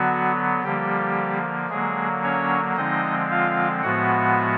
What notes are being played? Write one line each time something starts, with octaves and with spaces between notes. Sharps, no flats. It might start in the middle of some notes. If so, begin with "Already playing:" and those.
Already playing: D3 F#3 B3 F#4
D3 F3 G3 A#3 G4
D3 F#3 G#3 A#3 G#4
C#4 C#5
D3 F3 G#3 C4 D#4 D#5
F4 F5
A2 F3 G#3 B3 F#4 F#5